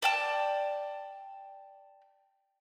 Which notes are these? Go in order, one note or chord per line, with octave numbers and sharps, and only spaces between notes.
D5 G5 A5